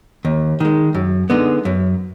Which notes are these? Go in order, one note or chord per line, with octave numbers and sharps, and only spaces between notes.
D#2
D#3 G#3
F#2
D3 G#3 B3 D#4
F#2